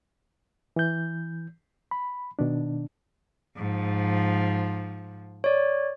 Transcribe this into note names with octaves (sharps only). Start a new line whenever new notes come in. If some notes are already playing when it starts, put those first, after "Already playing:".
E3 G6
B5
B2 D#3 D4
G#2 F3
C#5 D5